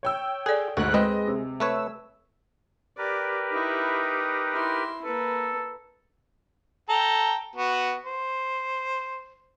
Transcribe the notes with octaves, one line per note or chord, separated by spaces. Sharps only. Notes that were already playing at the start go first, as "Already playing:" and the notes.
C#5 G5 E6
G#4 A4 D5
D2 G#2 F#4 F#6
G#3 C4 B4 D#5
C3
A3 B4 C#5 E6
G4 A#4 B4 D5
D#4 E4
E4 C6
A#3 A4 B4
A4 G5 A#5
B3 F#4
C5